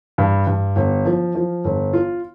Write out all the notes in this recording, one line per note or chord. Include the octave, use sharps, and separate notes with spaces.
G2
G2
G1
F3
F3
G1
F4